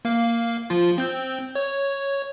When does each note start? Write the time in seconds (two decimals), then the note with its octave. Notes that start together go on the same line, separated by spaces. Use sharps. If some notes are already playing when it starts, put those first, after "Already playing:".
0.05 A#3 F5
0.70 F3 F4
0.98 C4 G6
1.55 C#5